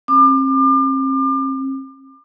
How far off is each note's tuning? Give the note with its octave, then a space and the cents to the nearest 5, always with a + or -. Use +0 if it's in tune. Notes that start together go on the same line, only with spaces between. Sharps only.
C4 +45 D6 +35